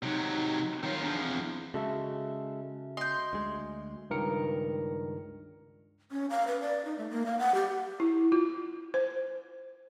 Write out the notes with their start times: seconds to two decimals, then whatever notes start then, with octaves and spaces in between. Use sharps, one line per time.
0.03 C3 F#3 D#4
0.83 D#3 F4 C#5
1.02 E2 F3 D4
1.21 C4
1.74 C#3 G#3 F#4 A4 E5
2.97 D#5 C6 G6
3.33 D2 G#3
4.10 C#2 G2 D#3 A#4 C#7
6.11 C#4
6.30 F5
6.47 B4
6.61 D5
6.85 D#4
6.98 A3
7.10 A#3
7.26 F5
7.39 F#5
7.55 G4
8.00 E4
8.32 F4
8.94 C5